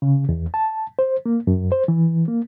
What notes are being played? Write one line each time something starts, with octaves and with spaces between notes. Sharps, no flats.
C#3
E2
A5
C5
A#3
F#2
C5
E3
A#3